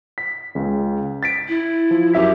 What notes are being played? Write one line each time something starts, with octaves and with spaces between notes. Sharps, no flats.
B6
C#2 C#3
A6 B6 D7
E4
F3
F#2 G4 E5 B6